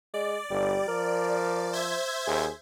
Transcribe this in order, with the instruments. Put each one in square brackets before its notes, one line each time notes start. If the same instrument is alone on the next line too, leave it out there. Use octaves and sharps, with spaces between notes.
[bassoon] G#3 [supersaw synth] D5
[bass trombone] G1 [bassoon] G3
[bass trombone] F3 [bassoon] A#4
[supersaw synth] C5 E5 G#6
[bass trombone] D#2 [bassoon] G#4